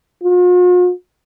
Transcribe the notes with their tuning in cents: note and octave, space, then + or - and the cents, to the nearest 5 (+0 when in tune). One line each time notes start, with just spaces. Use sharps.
F4 +45